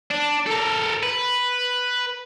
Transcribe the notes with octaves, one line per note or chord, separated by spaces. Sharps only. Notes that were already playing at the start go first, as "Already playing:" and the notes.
D4
A4 A#4
B4